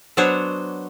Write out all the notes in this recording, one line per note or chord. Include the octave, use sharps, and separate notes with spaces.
F#3 B3 D4 C5 C#5